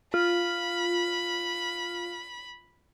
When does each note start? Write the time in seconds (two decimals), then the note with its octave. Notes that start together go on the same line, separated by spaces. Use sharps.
0.14 F4 B5